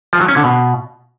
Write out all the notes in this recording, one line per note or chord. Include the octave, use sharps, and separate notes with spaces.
F3
F#3
C#4
D3
B2